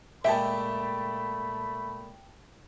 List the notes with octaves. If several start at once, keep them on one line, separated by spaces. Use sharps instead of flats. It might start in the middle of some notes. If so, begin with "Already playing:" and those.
A#2 G#3 A3 G4 E5 G5 A5 B5